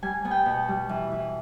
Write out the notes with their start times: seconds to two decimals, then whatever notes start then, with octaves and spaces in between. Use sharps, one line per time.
0.02 G3 G#5
0.25 B3 G#5
0.31 G5
0.46 B2
0.68 G3
0.89 E3
1.12 E3